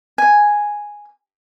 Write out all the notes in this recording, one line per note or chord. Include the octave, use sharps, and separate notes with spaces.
G#5